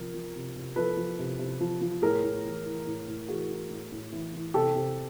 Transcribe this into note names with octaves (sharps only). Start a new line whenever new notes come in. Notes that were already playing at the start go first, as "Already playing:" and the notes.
Already playing: C3 F3 A#4
F3
C3
C3
F3 A4 B4
F3
C3
C3
F3
F3
A2 G#4 A#4
A2
E3
E3
A2
A2
E3 F#4 G#4
E3
A2
A2
E3
E3
C3 G4 A4
C3